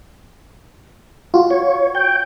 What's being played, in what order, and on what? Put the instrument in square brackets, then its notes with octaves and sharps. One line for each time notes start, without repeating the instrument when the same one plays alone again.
[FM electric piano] F4 F#4
[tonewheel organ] C#5
G5